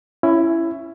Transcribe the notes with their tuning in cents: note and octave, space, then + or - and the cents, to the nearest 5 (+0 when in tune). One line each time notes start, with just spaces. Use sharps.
C#4 +0 E4 +15